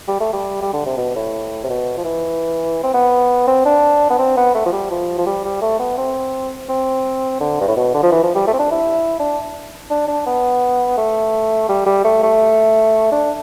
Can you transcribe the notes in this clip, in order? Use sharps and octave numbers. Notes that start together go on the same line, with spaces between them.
G3
A3
G3
G3
D3
C3
B2
A2
C3
B2
F3
E3
C4
B3
C4
D4
B3
C4
B3
A3
F3
G3
F3
F3
G3
G3
A3
B3
C4
C4
D3
G2
A2
B2
D3
F3
E3
F3
G3
A3
C4
D4
E4
D4
D4
D4
B3
A3
G3
G3
A3
A3
D4